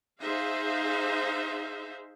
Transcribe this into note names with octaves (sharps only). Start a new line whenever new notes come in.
D#4 G#4 C5 E5 F5